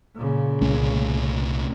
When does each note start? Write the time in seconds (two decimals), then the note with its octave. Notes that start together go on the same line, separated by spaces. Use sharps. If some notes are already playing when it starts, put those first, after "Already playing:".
0.14 A#2 C#3
0.61 C2 A3 C#4